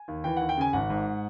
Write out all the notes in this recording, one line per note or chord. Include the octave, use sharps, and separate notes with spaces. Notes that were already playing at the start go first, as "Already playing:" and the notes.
Already playing: G#5
D#2
E3 G5
D#2 F#5
G5
C#3 G#5
G#1 F#5
G#2